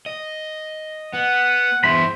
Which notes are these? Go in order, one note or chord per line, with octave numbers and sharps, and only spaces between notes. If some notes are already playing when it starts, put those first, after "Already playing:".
D#5
B3 F#5
E2 G2 C5 E5 B5